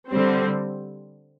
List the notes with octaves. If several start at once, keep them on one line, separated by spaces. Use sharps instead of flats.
D3 G3 C4